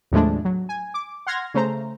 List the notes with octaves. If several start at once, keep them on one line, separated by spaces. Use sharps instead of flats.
D#2 A2 F3 G#3 A3 D4
F#3
G#5
D6
F#5 C6 F6 G#6 A#6
C#3 A3 C5 A#5